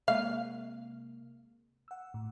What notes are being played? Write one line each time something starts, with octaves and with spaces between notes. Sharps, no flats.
C3 G#3 A#3 F5
F#5 E6
A2